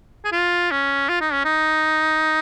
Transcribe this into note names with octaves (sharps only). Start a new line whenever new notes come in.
G#4
F4
C#4
F4
D#4
C#4
D#4